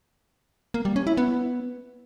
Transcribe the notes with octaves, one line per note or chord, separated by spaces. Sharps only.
A#3
G3
C#4
E4
B3